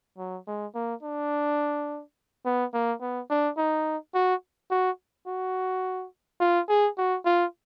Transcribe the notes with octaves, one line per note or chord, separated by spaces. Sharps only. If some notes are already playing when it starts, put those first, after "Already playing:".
F#3
G#3
A#3
D4
B3
A#3
B3
D4
D#4
F#4
F#4
F#4
F4
G#4
F#4
F4